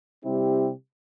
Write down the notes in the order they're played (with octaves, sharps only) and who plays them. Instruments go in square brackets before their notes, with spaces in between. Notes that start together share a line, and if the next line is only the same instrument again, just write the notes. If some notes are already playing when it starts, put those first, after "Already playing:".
[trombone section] C3 G3 C4 E4 G4